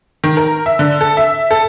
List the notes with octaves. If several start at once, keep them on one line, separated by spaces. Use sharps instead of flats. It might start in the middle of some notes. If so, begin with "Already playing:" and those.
D#3
A#4
E5
D3
A4
E5
A4